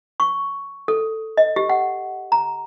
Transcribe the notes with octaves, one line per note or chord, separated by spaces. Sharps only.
C#6
A4
D#5
G4
F#5
A#5